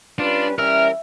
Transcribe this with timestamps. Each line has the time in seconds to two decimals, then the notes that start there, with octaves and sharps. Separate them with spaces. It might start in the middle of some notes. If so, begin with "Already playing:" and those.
0.19 G3 C#4 D4 F4 B4
0.58 E3 G3 C#4 A#4 E5 F6